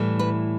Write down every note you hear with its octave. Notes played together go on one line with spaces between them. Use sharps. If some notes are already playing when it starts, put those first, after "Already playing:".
Already playing: A2 E3 G3
B4